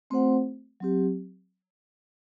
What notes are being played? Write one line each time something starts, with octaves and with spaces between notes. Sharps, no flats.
A3 C4 F#4 C5 F#5
F#3 C4 G4